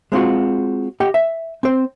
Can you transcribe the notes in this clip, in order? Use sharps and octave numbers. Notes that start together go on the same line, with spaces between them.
G#3 C4 F4 F#4
G4 D#5 F#5 G5
E5
C4 C5